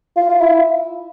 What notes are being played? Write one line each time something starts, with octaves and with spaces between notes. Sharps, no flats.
F4
F4
E4